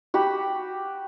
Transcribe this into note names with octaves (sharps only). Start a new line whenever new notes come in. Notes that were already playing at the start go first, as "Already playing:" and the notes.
F#4 G4 B5